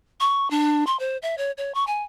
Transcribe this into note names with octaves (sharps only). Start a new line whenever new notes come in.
C#6
D4
C6
C5
E5
C#5
C#5
C#6
G#5